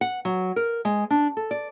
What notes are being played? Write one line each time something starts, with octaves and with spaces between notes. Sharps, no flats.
F#5
F#3
A#4
G#3
D4
A4
D5